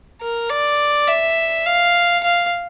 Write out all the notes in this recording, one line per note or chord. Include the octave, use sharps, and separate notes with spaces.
A#4
D5
E5
F5
F5